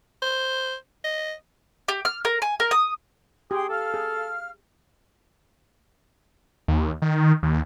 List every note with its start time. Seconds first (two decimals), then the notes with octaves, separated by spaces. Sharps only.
0.22 C5
1.04 D#5
1.88 G4
2.05 F6
2.25 A#4
2.42 G#5
2.60 A#4
2.71 D#6
3.51 G4 G#4 G5 C6
3.69 A4 F5 F6
3.94 G#4
6.68 D#2
7.02 D#3
7.43 D#2